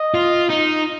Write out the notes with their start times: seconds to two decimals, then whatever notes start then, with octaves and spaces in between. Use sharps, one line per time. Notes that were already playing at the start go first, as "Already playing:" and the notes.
Already playing: D#5
0.14 F4
0.50 D#4